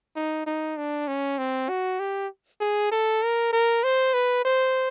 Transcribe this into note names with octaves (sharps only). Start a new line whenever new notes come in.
D#4
D#4
D4
C#4
C4
F#4
G4
G#4
A4
A#4
A#4
C5
B4
C5